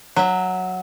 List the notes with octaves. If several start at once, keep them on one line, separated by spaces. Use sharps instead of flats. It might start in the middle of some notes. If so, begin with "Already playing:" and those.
F#3 E5